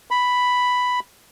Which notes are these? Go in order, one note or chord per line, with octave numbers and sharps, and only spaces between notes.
B5